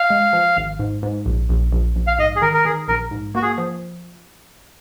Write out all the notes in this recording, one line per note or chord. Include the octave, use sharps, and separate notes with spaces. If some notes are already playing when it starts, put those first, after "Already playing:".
Already playing: F5
G#3
F3
G#1
G#2
G#2
A#1
A#1
A#1
A#1
F5
G#2 D#5
G#4
D#3 A#4
A#4
D#3 G#4
A#1 A#4
G#2
A#3 F#4
G#4
F3